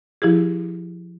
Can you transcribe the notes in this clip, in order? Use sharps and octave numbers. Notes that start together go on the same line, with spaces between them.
F3 E4 G4 G#4